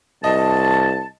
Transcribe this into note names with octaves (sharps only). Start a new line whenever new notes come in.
C2 D#5 A5